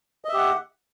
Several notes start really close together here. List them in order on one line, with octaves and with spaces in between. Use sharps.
D#5 E5 G4 F#5